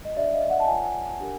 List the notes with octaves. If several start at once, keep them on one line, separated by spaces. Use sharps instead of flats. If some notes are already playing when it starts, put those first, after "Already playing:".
D#5
D4 G4 C5 D5 E5
D#5 F5
E5 F#5
A5
F4 A#4 C#5 F#5 G#5
D4 G4 A#4